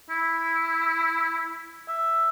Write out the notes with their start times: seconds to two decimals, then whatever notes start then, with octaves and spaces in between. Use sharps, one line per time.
0.10 E4
1.88 E5